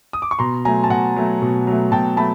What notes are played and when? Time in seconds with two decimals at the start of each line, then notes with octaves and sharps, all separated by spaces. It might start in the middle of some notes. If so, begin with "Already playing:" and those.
0.13 D#6
0.22 D6
0.31 C#6
0.39 B2 A#5 C6
0.65 F#3 A3 G#5 A#5
0.84 A5
0.90 B2 F#5 G#5
1.16 F#3 A3
1.42 B2
1.67 F#3 A3
1.92 B2 G5 A5
2.17 F#3 A3 A5 B5